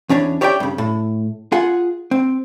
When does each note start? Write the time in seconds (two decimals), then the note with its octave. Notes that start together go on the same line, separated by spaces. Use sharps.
0.09 E2 C#4 D4 C#5
0.41 G4 C#5 D5 E5 F5 G5
0.60 G2 C#3
0.78 A2
1.52 F4 G#4 F#5
2.11 C4